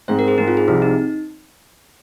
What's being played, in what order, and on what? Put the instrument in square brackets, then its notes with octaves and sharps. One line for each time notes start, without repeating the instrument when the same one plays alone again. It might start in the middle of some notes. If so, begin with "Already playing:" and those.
[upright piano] G#2 G#3 C4 [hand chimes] C5
[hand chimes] A#4
G#4
[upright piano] G#2 G#3 C4 [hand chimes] D#4
[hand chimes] F4
G#4
[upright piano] C2 C3 F3 [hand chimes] C4
[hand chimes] D#4